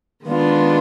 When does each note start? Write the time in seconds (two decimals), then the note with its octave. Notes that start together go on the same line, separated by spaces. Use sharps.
0.25 D#3 G#3 B3 D4 F4